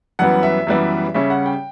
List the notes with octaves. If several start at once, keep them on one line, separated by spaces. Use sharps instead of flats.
F#2 E3 G3 B3 F#5
E5
F#2 E3 G3 B3
C#3 G3 C#4 E5
F#5
G5